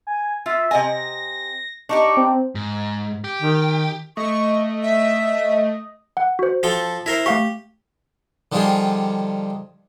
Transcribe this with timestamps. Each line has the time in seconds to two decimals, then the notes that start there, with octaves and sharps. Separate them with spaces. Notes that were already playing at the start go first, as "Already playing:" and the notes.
0.07 G#5
0.46 F4 E5
0.71 C3 D#5 G#5 A#6
1.89 D4 D#4 G4 C#6
2.17 C4
2.55 G#2
3.24 G4
3.42 D#3
4.17 A3 D#5 C#6
4.83 E5
6.17 F#5
6.39 F#4 C5
6.63 F3 A4 G5
7.06 E4 A#4 C5
7.26 A3 G4 F5 C#6
8.52 D3 D#3 F3 G3 F4 G#4